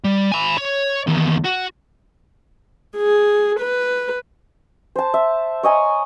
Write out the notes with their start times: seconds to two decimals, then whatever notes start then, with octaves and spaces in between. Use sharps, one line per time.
0.05 G3
0.32 G#5 B5
0.57 C#5
1.07 E2 D#3
1.44 F#4
2.97 G#4
3.60 B4
4.96 C5 A5
5.14 E5
5.63 C#5 D#5 G#5 A#5